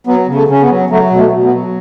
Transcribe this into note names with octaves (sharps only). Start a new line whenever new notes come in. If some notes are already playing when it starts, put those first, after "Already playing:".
F#3 B3
C#3
A3
C#3 C#4
B3
F#3
F#3 A3
B2
A3
B2
B3
F#3